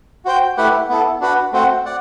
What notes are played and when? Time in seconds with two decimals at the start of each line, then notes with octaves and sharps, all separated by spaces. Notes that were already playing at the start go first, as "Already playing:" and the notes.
0.25 F#4 C5 G5
0.57 A3 E4 G4 B4 F#5
0.89 B3 E4 A4
1.20 D4 F#4 B4 F#5
1.53 A3 C4 F#4 C5 F#5
1.86 D5 F#5